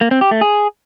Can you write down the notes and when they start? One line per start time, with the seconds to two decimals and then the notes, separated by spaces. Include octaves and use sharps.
0.01 A#3
0.11 C4
0.21 G4
0.31 A3
0.41 G#4